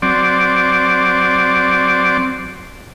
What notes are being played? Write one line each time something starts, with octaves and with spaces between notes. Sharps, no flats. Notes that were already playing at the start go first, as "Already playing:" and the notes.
F#3 C4 D5